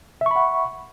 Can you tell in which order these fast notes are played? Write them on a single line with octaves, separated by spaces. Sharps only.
E5 C#6 B5 F#5